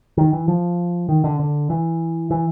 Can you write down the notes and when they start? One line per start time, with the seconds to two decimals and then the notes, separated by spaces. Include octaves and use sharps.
0.17 D#3
0.33 E3
0.48 F3
1.09 D#3
1.24 D3
1.39 D3
1.70 E3
2.30 E3